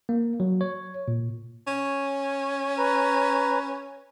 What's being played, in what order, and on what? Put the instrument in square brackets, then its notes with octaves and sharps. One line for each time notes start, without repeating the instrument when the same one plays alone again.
[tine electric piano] A#3
F#3
C#5
A#2
[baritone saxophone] C#4
[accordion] B4 A#5